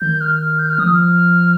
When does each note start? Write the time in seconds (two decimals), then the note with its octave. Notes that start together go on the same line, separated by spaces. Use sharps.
0.01 D#3 G6
0.21 F6
0.40 F6
0.59 G6
0.70 F6
0.78 F3 D#6
0.89 F6